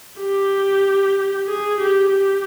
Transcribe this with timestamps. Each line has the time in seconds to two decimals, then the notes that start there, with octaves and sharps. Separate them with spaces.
0.19 G4
1.47 G#4
1.80 G4
2.12 G4